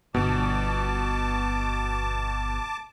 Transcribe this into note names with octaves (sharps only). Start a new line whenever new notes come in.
G1 B2 A5 D6